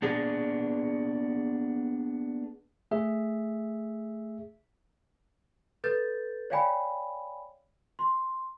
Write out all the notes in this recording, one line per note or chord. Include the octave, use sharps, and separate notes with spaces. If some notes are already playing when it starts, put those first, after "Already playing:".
A#3 B3 D4 G#4
A3 G#4 E5
A4 B4 G6 A6
C#5 D5 F5 G5 G#5 B5
C6